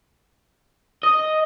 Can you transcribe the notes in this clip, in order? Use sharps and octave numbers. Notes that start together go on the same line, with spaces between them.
D#5